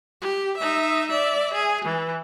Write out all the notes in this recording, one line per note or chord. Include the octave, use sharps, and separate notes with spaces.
G4
D#4 E5
D5 E5
G#4
E3